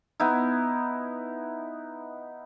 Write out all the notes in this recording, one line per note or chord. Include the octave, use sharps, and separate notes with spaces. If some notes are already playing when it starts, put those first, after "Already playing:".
B3 D#4 E4